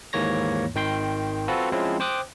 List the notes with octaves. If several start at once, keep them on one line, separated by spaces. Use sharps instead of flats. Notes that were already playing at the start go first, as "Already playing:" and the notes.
D#2 G#2 E3 A#3 C#5 A#6
G#1 D#3 G5 C6
C4 F4 F#4 A4 B4
F3 G#3 C4 C#4 E4
C5 G5 D6 D#6 F#6